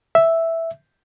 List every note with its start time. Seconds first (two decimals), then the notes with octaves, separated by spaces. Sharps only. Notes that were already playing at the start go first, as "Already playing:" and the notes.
0.15 E5